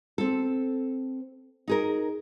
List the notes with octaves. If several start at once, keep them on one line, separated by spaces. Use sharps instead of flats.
C4 A4
D#4 G#4 A#4